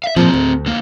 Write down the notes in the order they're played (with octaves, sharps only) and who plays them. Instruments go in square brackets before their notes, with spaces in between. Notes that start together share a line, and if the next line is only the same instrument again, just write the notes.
[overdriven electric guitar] E5 F5
[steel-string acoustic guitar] G2 A#2 F3 [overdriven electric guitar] C4 G#4
[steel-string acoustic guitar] D2
[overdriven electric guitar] D3 A#3